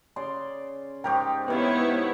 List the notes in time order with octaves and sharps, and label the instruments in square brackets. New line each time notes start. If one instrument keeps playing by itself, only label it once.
[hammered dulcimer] C#3 D5 C6
[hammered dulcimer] G#2 G4 A#4 [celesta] G5 C#6
[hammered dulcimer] C3 D#3 F5 [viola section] B3 E4 C#5 [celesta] B4